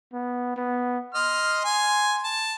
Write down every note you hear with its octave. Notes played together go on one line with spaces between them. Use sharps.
B3
B3
D#5 C6 F6
G#5
A5